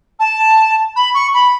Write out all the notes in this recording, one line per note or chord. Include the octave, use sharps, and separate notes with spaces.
A5
B5
C#6
B5